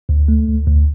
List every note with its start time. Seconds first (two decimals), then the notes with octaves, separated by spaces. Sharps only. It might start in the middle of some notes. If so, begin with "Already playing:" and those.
0.09 D2
0.28 A3
0.48 D2
0.68 D2